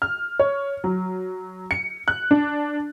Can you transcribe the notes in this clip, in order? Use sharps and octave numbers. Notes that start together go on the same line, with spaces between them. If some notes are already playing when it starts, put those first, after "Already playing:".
F6
C#5
F#3
C#7
F#6
D4